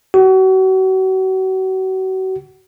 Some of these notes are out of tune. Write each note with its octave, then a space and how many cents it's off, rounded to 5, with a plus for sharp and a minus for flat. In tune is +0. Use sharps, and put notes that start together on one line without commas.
F#4 +35